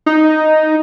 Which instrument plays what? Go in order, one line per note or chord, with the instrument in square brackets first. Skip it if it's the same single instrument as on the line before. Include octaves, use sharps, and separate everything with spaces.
[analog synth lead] D#4